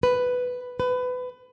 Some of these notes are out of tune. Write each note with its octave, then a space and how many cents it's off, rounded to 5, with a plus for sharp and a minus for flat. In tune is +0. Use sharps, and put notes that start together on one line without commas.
B4 +5
B4 +25